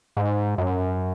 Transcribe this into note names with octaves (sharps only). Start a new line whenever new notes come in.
G#2
F#2